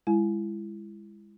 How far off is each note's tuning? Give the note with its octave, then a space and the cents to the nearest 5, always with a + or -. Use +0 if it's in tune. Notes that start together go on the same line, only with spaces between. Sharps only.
G#3 -25 E4 +25 G#5 +25